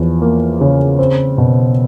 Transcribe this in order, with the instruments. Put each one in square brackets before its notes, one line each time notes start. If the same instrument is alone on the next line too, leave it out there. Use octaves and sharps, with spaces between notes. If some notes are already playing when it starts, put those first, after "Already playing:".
Already playing: [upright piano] E2 F3
A#3
C#3
C4
B2